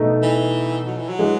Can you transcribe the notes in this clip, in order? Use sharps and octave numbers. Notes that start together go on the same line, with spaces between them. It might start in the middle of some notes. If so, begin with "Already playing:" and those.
Already playing: B2 A3 D#4
E3
F#3
E3
F#3
E3 G#3